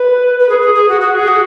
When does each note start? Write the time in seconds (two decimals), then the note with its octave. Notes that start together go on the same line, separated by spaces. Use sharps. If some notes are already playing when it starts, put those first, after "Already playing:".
Already playing: B4
0.39 B4
0.49 G#4
0.61 G#4
0.74 G#4
0.88 F#4
1.00 F#4
1.14 G#4
1.27 F#4